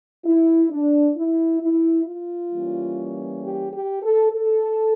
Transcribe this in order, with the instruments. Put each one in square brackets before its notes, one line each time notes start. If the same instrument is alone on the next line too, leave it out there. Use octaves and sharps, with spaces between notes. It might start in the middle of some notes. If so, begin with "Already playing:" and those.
[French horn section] E4
D4
E4
E4
F4
E3 G3 A#3 C#4
G4
G4
A4
A4